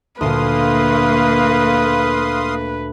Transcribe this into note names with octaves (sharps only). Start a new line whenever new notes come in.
D2 A#2 A#3 B4 F5 C6 D#6